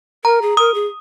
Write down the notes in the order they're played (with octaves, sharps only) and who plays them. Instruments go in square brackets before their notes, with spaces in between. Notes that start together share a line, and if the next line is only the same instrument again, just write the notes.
[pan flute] A#4 [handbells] A#5
[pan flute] G#4
[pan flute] A#4 [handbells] D#6
[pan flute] G#4